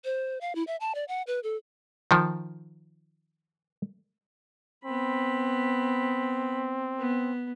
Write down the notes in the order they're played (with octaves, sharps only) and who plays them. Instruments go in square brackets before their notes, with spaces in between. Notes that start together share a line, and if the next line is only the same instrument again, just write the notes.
[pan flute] C5
F5
E4
E5
A5
D5
F#5
B4
A4
[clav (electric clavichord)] D#3 F3
[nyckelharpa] B3 B5 [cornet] C4
[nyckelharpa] B3